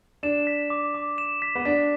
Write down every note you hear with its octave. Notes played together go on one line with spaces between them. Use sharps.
D4 E7
B6
D6
D6
E7
B6
B3
D4 B6